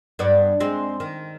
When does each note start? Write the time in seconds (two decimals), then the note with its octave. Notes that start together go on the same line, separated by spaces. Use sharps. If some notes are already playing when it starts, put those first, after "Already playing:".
0.19 G2 B3 D5
0.60 G#3 C4
1.00 D#3